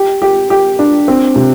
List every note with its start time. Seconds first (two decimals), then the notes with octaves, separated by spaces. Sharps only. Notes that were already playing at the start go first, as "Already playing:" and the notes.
Already playing: G4
0.22 G4
0.50 G4
0.79 D4
1.08 C4
1.36 C3